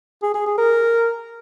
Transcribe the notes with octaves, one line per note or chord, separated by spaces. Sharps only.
G#4
G#4
G#4
A#4